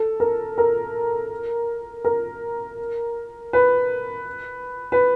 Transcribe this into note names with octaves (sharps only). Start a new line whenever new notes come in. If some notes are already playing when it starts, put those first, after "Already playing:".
Already playing: A4
A#4
A#4
A#4
B4
B4